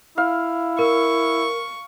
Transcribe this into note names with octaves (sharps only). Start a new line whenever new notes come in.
E4 F5
A#4 C#6